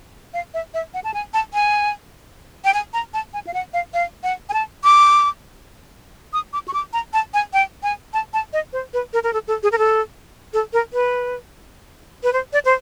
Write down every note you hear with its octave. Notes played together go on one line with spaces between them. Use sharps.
F5
E5
E5
F#5
A5
G#5
A5
G#5
G5
G#5
A#5
A5
G#5
F5
F#5
F5
F5
F#5
G#5
A5
D6
D#6
D6
C#6
D6
A#5
A5
G#5
G5
G#5
A5
A5
D#5
C5
B4
A#4
A#4
A4
A4
G#4
A#4
A4
A4
A#4
B4
B4
C5
D5
C5